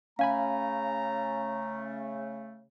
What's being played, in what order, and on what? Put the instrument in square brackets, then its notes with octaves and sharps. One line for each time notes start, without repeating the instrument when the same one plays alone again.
[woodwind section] C#3 A3 [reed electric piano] C#4 G#5 B5 [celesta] F5 [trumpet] A#5